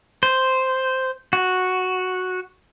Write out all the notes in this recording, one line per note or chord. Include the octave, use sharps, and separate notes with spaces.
C5
F#4